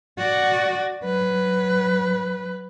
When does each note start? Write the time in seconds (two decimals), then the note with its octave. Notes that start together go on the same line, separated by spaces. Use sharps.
0.18 F#4 D5
1.03 F#3 B4